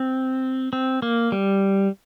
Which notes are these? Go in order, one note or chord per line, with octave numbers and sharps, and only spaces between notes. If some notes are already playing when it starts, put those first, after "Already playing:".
Already playing: C4
C4
A#3
G3